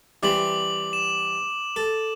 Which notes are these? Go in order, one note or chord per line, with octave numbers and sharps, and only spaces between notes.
E3 G3 C4 D6 F#7
E7
A4